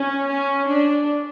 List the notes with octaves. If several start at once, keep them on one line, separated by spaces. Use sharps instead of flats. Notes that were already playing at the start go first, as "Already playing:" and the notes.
Already playing: C#4
C#4
D4